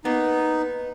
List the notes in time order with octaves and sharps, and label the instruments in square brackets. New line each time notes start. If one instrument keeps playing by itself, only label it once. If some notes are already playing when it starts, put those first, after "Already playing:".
[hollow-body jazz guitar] A#3 B3 [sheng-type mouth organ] D#4